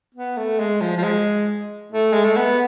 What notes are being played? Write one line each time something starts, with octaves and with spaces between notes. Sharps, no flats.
B3
A3
G#3
F3
F3
G#3
A3
G#3
A3
B3